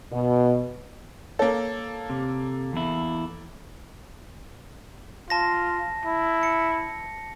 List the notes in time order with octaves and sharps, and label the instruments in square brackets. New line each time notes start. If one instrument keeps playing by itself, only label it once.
[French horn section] B2
[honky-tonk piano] A#3 A4 [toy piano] C#5
[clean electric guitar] C3
E2 E4
[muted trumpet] F4 [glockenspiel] A5 A#6
[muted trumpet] E4
[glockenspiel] C#7